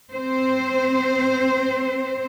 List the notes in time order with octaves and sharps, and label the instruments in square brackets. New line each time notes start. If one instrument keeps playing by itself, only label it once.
[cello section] C4 C5